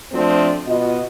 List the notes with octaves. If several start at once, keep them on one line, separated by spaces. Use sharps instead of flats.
F3 A3 C4 D4
B2 F4 D#5